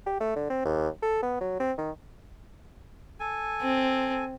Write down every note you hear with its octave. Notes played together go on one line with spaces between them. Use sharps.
G4
A3
D3
C4
D#2
A4
B3
F#3
C4
D#3
A4 G#5
C4